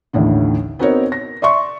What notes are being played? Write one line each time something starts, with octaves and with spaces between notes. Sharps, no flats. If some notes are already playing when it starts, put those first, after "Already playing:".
A1 D#2 A2 D3 D#3
B3 C4 D#4 F#4 A#4 C#5
A#6
D5 E5 C6 C#6